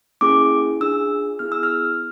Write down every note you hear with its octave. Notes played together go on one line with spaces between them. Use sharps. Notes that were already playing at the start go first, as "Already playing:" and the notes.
A#3 C#4 E4 G#4 D6
D4 F4 G#4 E6
B3 E4 G#4 F6
E6
F6